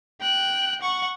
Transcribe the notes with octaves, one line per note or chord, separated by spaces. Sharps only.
G5 F#6
F#5 C#6